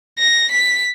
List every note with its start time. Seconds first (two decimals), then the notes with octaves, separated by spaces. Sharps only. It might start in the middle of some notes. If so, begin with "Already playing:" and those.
0.19 A#6
0.51 B6